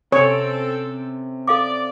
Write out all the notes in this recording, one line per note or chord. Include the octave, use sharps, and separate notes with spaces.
C3 C4 C#4 A4 C#5
A4 D5 F5 D6